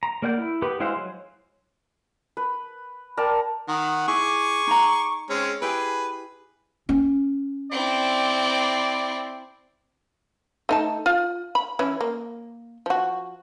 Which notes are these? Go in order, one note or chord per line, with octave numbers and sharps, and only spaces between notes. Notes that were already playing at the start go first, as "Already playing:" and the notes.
A#5
A#3 A#4 D5 F#5 G6
E4
B3 G4 B4
G#3 E4 F#4 C5 F5
F#3
B4
A#4 D5 G5 A5
D#3 F#5
E4 G#4 C#6 D6
D#4 A#5
G#3 C4 C#4
E4 G4 G#4 B4
C#4
C4 E4 D5
A3 D#4 A5
F4
B5
E3 C#4 E4
A#3
F3 F#4